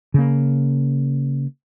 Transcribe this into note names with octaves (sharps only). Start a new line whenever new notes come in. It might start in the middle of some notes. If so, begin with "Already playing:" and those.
C#3 A#3